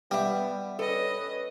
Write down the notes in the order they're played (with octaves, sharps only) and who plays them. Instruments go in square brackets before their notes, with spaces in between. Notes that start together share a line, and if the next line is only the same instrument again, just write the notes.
[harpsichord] G3 [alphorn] B3 [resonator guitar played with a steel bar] E5 G5
[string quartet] C#4 D#5 [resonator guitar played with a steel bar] A4 [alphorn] B4